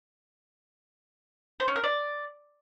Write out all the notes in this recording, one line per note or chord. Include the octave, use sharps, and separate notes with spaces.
C5
C#4
A#4
D5